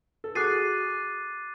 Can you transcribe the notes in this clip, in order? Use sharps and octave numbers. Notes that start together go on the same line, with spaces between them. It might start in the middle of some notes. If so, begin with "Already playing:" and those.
A4
F#4 G#4 D6 F#6 A6 C7 D#7